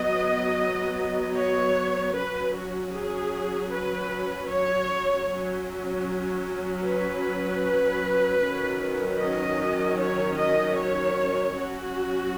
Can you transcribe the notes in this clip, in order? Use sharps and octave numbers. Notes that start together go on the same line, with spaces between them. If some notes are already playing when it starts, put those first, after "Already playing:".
Already playing: F#3 B3 D#5
C#5
F#3 C#4 B4
F#4
G#4
B4
C#5
F#3 C#4
B4
D#3 F#3 C#4
D#5
C#5
D#5
C#5
F#3 C#4 F#4